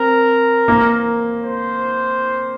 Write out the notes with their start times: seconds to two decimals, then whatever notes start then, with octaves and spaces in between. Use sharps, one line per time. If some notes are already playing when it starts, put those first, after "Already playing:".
Already playing: C4 A#4
0.68 A#3
1.43 C5